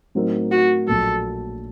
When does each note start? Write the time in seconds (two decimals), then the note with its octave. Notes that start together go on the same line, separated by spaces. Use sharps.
0.15 A2 F#3 C4 D#4 A#4
0.51 F#4
0.87 A#1 A#2 F#3 A4